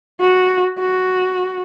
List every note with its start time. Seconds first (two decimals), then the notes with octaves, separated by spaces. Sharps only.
0.20 F#4
0.79 F#4